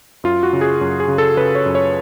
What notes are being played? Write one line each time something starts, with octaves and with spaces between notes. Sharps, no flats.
F#2 F4
F#4
C#3
G#4
F#2
G#4
C#3
A4
C#3 B4
C#5
F#2
C#5